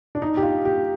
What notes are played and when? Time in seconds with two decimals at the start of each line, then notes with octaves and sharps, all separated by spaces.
0.15 D4
0.22 D#4
0.37 G4
0.43 F4
0.65 G4